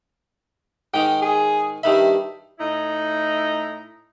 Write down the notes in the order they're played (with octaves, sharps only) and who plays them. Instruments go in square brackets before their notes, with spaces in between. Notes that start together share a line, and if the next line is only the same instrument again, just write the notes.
[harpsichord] G#2 D#3 [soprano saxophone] G5
[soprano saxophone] G#4
[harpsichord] G2 D#3 B5 [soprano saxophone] E5
[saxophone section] A2 D#4 E4